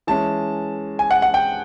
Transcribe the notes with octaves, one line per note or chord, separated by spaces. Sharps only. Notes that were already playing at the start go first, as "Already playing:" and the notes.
E3 G#3 C#4 A5
G#5
F#5
F#5
G5